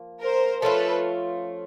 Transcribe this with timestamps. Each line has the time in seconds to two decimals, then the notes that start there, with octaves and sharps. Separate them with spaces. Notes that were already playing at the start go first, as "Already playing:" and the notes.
Already playing: F3 A#3
0.21 A#4 C5
0.62 F3 A3 C#4 F4 A4 B4